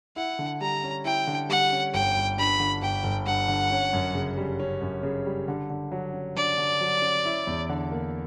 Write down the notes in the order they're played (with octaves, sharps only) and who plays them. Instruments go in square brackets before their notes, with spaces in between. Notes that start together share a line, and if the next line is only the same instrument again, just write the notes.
[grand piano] E4 [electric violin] F#5
[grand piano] D3
[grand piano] G3 [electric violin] A#5
[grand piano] C#4
[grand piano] E4 [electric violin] G5
[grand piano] D3
[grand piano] G3 [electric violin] F#5
[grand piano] C#4
[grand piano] G1 [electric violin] G5
[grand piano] G1
[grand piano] G2 [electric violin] B5
[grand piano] D3
[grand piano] G1 [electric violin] G5
[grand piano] G1
[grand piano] G2 [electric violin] F#5
[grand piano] D3
C#4
F#2
C#3
G3
C#4
F#2
C#3
G3
D3
D3
F#3
C#4
[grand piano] D3 [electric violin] D5
[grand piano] D3
F#3
C#4
E4
E2
D3
A#3